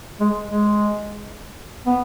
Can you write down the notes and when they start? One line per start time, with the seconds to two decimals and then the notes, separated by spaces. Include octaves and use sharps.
0.20 G#3
0.47 G#3
1.87 B3